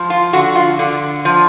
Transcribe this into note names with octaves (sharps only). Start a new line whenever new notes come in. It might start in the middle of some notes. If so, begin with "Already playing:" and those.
Already playing: F3
F4
D3 F#4
F4
D3
F3